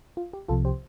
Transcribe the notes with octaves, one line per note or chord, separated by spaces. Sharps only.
F4
G4
C2 C3 F3 F4 A4
G4 C5